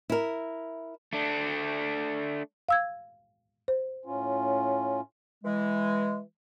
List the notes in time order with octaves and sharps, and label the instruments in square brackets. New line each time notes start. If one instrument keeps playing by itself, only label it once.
[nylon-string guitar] E4 A#4
[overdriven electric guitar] A3 D4
[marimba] F5 E6 G#6
C5
[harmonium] A2 C#4 F4
[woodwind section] E3 G#3